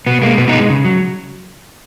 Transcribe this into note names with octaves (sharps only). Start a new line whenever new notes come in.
B2 B3
G#3 A#3
B2 B3
B3 D#4
G#3
C#3
F#3